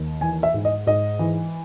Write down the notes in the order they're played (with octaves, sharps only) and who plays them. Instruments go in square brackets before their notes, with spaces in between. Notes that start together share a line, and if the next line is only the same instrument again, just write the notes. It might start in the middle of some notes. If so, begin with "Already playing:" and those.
Already playing: [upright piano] D#2
E3 G#5
E5
G#2
D#5
G#2 D#5
E3